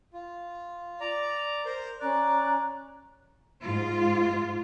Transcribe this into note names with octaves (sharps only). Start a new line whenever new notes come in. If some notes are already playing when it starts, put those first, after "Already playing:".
F4
D5 A#5
A#4 C5
C#4 D5 A#5 F#6
G#2 F4